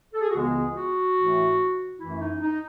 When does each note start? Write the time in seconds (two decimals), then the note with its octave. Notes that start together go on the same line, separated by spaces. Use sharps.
0.14 A4
0.21 G#4
0.29 F#4
0.34 C#2 C#3 E3 G#3 B3 G#4
0.76 F#4
1.16 A2 E3 A3
1.99 F#2 E3 A3 E4
2.20 D#4
2.41 D#4